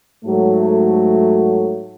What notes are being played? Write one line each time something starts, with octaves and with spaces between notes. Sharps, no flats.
G#2 F#3 A3